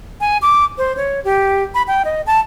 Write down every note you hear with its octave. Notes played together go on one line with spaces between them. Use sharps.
G#5
D6
C5
C#5
G4
B5
G5
D#5
A5